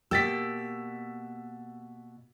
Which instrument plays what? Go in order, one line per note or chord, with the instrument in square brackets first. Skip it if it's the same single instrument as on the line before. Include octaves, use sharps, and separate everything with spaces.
[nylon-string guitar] B2 A#3 G4 [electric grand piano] E6 A6 B6